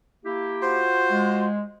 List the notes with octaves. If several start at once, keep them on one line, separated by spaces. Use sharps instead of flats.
A#3 E4 G4
F4 F#4 C5
G#3